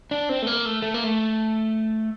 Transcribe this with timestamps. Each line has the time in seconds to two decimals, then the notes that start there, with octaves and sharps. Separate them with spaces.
0.11 D4
0.29 C4
0.42 A3
0.47 A#3
0.65 A3
0.82 A3
0.94 A#3
1.04 A3